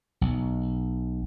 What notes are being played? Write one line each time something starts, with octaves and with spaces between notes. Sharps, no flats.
B1